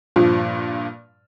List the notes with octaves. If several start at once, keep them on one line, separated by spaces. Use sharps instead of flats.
G2 A#2 F3